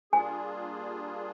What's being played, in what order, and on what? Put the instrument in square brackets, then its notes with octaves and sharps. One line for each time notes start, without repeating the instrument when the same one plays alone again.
[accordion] G3 A#3 D4 F4 G#4 [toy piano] G#5